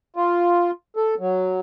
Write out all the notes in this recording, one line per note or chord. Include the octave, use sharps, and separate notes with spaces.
F4
A4
F#3